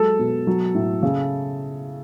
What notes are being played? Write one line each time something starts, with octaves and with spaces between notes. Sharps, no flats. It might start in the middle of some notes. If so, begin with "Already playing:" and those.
Already playing: F#3 G#3 A4
B2
F#3
A2
C#3